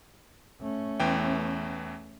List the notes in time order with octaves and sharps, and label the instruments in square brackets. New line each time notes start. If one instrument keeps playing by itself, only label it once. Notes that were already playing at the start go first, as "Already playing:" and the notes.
[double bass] A3 C#4
[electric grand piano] E2 E3 G5